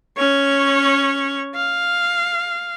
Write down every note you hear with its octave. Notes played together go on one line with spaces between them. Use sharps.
C#4 C#5
F5